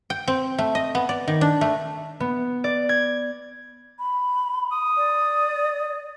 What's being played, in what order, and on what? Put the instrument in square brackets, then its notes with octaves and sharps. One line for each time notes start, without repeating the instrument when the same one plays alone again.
[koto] G5
C4
A3
D#5
B3
D5
D#3
D4
A3
[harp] B3
D5
G#6
[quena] B5
[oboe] D#6
[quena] D5